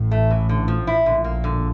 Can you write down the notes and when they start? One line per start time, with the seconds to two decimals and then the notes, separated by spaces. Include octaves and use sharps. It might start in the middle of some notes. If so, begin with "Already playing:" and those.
Already playing: A1 A2
0.11 A3
0.31 E3
0.49 D3
0.68 F3
0.87 E4
1.06 A#1 A#2 D3
1.24 A#3
1.44 D3